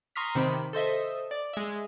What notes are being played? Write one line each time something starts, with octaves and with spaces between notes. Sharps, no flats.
A#5 C6 C#6 D#6 F6 B6
C3 D#3 C4 B5
A4 C5 D#5 E5
D5
G#3 E5